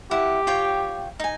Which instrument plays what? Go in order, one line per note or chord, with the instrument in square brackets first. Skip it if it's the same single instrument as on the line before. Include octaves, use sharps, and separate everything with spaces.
[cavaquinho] E4 F#5 [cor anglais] G4
[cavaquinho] F4 C#5 G5
D#4 G#5